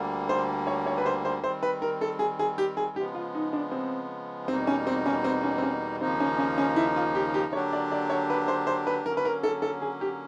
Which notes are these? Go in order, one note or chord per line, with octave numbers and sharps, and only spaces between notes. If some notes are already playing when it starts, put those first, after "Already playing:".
Already playing: D2 D3 G3 A#3
C5
C#5
C#5
B4
C5
C5
D#3 G3 C4 C5
B4
A#4
A4
G#4
G#4
G4
G#4
C#3 F3 G#3 B3 G4
F4
D#4
D4
C4
E2 B2 G3 A#3 C4 D#4
C#4
C4
C#4
C4
C#4
C4
C#4
D#2 C#3 F3 A#3 C4 D#4
C#4
C#4
C#4
E4
F4
G4
G4
D3 F#3 A#3 D4 G4 C#5
D5
D5
C#5
B4
C5
C5
B4
D3 F#3 A#3 C#4 A#4
B4
A#4
A4
A4
G#4
G4